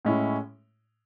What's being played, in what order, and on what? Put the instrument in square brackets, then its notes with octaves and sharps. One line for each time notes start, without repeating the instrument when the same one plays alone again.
[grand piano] A2 G#3 C#4 E4